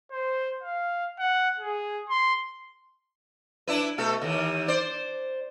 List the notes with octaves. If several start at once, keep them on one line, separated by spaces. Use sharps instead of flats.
C5
F5
F#5
G#4
C6
D4 E4 B4
B2 A3 A4
D#2 E3
C5 D5